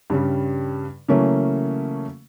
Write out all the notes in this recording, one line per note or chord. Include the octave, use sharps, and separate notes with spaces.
G2 C#3 G3
C#3 E3 F#3 A3 A#3 C#4